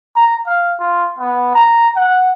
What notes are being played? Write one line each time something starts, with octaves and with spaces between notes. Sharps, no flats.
A#5
F5
F4
B3
A#5
F#5